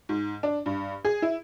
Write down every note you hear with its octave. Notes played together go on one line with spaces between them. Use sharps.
G#2
D4
G2
G#4
E4